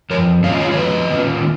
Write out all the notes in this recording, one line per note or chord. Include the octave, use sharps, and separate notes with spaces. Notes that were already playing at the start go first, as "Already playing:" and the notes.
F2 A#4 C#5
D#3 A#3 C#4 F4 C#5 F5
D#5
C#5 F5
C#5
F2 B4 D#5
D#3 A#3 C#4 F4